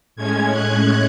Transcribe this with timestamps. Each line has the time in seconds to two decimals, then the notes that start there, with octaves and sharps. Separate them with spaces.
0.16 A2 G#3 C#4 G#6
0.51 F#6